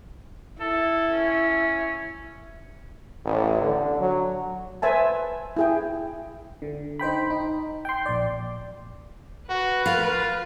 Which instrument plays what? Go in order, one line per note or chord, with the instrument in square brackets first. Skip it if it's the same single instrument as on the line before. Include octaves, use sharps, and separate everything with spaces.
[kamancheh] E4 [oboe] A4
[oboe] C#4
[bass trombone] A1
D3
F#3
[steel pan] B4 C5 E5 G#5 A5
E4 G#4 G5
[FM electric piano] D3
D#4 C5 G5 B5
D#4
G5 C6
A#1 D5
[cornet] F#4 [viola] B4
[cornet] F4 [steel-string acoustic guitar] A#4 F5